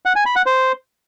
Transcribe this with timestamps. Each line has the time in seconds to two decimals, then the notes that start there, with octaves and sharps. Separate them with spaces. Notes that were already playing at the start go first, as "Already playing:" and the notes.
0.06 F#5
0.16 G#5
0.26 B5
0.36 F#5
0.46 C5